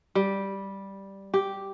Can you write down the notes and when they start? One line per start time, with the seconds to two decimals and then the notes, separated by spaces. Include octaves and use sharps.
0.15 G3
1.34 G4